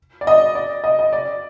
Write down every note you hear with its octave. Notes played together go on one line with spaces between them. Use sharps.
D5
D#5
D5
D#5
D#5
D5